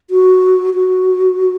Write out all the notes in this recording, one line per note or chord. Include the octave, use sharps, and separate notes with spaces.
F#4
F#4